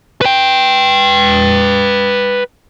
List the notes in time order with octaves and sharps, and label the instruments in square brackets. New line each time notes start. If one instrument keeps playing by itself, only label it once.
[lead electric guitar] B4 G5